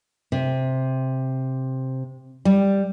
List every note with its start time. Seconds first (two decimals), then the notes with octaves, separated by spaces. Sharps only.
0.32 C3
2.45 G3